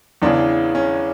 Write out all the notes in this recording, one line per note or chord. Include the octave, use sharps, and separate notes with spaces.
E2 C#3 E3 D4
C#4